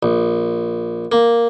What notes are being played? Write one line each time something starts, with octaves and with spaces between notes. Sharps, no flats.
A#1
A#3